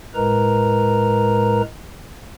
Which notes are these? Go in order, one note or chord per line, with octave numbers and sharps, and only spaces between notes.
A2 G#3 A#4 B4 A#5